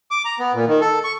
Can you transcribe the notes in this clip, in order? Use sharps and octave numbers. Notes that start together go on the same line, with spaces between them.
D6
A#5
B3
A#2
D#3
A4
C#6